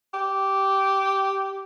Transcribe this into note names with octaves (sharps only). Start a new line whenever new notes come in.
G4